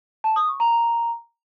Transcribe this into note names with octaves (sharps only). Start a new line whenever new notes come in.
A5
D#6
C#6
A#5
A#5